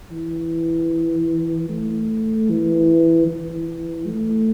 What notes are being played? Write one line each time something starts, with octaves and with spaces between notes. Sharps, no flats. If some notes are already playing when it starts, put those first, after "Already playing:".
E3
A3
E3
E3
A3